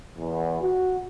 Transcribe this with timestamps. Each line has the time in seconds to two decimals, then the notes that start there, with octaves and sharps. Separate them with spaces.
0.18 E2
0.63 F#4